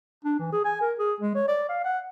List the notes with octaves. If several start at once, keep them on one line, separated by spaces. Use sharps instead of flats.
D4
E3
G#4
G#5
A#4
G#4
G#3
C#5
D5
F5
F#5